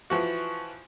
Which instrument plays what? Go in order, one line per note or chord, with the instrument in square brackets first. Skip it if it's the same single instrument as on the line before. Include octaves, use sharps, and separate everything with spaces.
[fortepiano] E3 F3 F#4